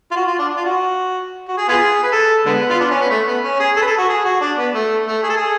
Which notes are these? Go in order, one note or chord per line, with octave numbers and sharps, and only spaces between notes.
F4
F#4
F4
D4
F4
F#4
F#4
G#4
B3 F4 G#4
B4
A4
D3 G#3 B3
F4
D4
C#4
B3
A3
B3
C#4
G#4
A4
B4
A4
F#4
G#4
F#4
D4
B3
A3
A3
G#4
A4
G#4